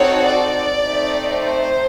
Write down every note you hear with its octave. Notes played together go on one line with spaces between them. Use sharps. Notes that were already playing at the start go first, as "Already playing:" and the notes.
Already playing: C4 D#4 F#4 A4 C#5
D5
A3 C4 D#4
C5